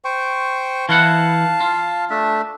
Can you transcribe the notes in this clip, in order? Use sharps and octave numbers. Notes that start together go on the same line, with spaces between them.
C5 G5 C#6
E3 E4 F5 F#5 A5
F4
A3 D4 E5